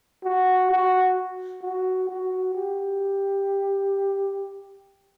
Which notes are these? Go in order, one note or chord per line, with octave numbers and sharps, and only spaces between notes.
F#4
F#4
F#4
F#4
G4